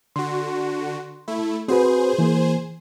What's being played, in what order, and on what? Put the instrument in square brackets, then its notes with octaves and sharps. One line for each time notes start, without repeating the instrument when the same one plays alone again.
[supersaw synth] D3 F#4 [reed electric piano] C6
[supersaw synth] A3 E4
[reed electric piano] C4 F#4 B4 [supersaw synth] G#4 C5
[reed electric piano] E3 A#3